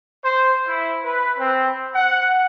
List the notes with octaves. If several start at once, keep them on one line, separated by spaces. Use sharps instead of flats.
C5
E4
B4
C4
F#5